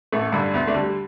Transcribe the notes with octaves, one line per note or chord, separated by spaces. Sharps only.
A1 A3
G2 D3
D2 B3
A3 D4
D3 G3